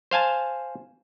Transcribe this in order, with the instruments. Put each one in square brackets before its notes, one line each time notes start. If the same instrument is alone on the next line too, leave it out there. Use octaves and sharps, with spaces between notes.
[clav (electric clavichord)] C5 F5 G#5 A5